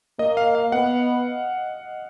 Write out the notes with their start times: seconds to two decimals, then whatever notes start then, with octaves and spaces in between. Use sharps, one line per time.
0.19 A#3 D#5
0.37 F5
0.55 F5
0.72 B3 F#5